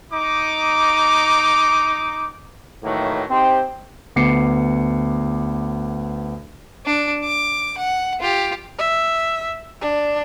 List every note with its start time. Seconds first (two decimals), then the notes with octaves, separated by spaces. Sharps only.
0.13 D#4 D6
2.84 A2 D#3 E3 F#3 A3 A#3
3.30 C4 D#4 G4 C5
4.16 D2 B3 D6 C7 C#7
6.86 D4
7.24 D6
7.78 F#5
8.21 F4 G4
8.79 E5
9.81 D4